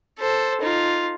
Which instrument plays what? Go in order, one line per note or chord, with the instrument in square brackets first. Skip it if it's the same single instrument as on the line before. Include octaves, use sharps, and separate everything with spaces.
[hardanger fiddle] A4 C5
D#4 F4